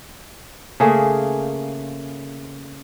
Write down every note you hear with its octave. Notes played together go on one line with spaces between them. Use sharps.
C#3 A3 A#3 G#4